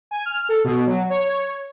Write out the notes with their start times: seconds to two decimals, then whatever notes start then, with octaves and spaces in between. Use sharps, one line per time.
0.11 G#5
0.26 F6
0.49 A4
0.64 B2
0.86 F#3
1.10 C#5